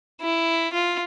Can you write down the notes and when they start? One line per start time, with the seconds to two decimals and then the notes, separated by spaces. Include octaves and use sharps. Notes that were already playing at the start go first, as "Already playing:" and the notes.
0.21 E4
0.73 F4